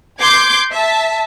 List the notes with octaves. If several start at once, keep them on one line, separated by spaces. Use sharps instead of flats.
C6 D6 G6 G#6
E5 A5